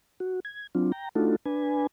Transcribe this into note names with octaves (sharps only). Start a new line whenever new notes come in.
F#4
G#6
F#3 C4 D4 F4
G5 A#5
A3 D4 D#4 F4 F#4 A4
D4 B4 G#5